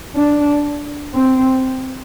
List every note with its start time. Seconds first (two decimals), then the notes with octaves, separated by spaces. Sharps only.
0.16 D4
1.14 C4